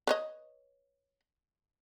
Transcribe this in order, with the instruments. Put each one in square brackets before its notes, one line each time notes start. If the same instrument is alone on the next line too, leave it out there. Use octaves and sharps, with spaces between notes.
[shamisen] B4 C#5 D#5